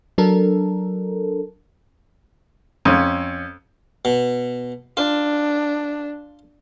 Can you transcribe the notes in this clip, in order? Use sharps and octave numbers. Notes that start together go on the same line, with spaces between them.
F#3 D4 A4 A#4
F2 C#4
B2
D4 F4